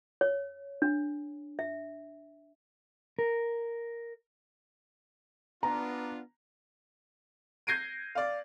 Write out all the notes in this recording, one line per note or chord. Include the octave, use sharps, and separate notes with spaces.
C#5
D4
E5
A#4
B3 D4 F4 A#5
G6 G#6 A#6 C7 D7 D#7
D5 F5